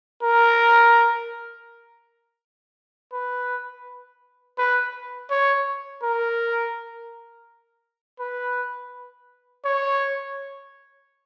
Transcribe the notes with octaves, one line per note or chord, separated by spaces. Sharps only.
A#4
B4
B4
C#5
A#4
B4
C#5